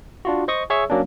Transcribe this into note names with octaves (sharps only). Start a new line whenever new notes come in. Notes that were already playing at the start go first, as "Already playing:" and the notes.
D4 F4 F#4
C5 D#5 C#6 D#6
G#4 C#5 E5 C#6 E6
F#3 A#3 C#4 D4